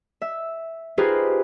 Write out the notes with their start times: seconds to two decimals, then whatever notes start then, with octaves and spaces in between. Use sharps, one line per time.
0.22 E5
0.98 D#4 F4 G4 G#4 B4 C5